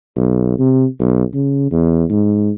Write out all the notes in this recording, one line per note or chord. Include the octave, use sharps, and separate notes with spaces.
B1
C3
B1
C#3
E2
G#2